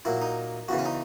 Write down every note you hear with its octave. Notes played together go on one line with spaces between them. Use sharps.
A#2 F#3 E4
D#4
E2 C#3 E3 F#4
C#4
D#4